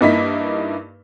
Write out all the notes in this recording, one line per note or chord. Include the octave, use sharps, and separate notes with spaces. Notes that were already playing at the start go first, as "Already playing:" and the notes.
G2 A#3 D#4 E4 B6